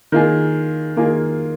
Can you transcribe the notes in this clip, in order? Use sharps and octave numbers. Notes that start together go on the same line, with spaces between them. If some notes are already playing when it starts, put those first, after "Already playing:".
D#3 A#3 F4 G#4
D#3 A#3 F4 G#4